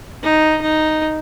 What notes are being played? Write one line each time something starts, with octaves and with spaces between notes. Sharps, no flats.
D#4
D#4